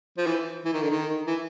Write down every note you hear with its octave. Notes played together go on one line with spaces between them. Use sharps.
F3
E3
E3
D#3
D3
D#3
E3